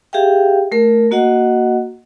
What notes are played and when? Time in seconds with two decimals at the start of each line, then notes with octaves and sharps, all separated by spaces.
0.13 G4 G#4 E5 F5 G5
0.72 A3 A#4
1.11 A#3 F#4 D#5 F#5